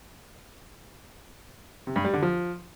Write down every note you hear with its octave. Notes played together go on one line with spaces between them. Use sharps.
C3
G2
G3
D3
F3